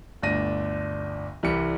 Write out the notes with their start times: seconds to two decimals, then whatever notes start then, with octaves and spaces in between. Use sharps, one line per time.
0.22 G1 D2 D4 A#6 D#7
1.43 C2 E3 G3 G4 B5 C#7